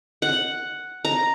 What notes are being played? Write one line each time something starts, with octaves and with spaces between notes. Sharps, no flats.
F#5
A#5